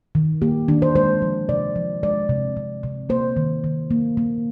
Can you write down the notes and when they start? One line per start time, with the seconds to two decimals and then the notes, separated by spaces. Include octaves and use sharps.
0.15 D#3
0.42 A#3 G4
0.68 D#3 D4
0.82 C5
0.95 G#3 C5
1.22 F3
1.49 C3 D5
1.76 F3
2.03 G#3 D5
2.29 C3
2.57 C3
2.83 C3
3.09 A#3 C5
3.37 D#3
3.64 D#3
3.91 A#3
4.17 A#3